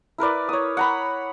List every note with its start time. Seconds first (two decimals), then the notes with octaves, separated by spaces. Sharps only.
0.18 E4 A#4 B4 D5
0.49 C#5 D#6
0.77 F#5 A#5 B5